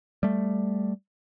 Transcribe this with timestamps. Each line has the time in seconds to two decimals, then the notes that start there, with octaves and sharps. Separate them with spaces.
0.23 G3 A3